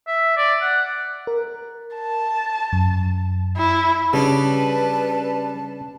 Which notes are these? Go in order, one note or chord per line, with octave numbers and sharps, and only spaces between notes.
E5
D5
F#5
A#4
A5
F#2
E4
C#3 G3 D4 B4 A5